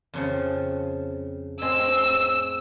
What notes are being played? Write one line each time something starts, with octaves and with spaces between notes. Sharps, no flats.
F2 C#3 F3
A2 G#3 C4 E6